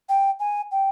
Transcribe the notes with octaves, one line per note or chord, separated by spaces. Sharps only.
G5
G#5
G5